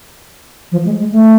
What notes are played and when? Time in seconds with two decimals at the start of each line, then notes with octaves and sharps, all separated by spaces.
0.72 F3
0.85 G#3
0.99 G#3
1.12 A3